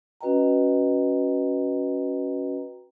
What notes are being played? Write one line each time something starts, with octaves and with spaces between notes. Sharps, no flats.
C#4 F#4 B4 D#5 G5 A#5